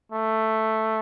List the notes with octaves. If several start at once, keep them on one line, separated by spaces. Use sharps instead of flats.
A3